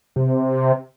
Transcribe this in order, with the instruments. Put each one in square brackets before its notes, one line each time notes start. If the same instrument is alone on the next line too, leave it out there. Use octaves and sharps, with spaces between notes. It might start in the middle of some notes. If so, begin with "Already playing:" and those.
[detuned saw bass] C3